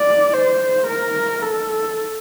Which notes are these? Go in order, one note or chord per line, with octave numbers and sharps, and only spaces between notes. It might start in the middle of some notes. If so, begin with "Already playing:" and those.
Already playing: D5
C5
A#4
A4